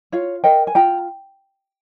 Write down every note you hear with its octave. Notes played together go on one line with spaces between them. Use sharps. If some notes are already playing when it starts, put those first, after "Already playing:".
F4 C#5 F5
A#4 D#5 G5
G#5
F4 G5 A#5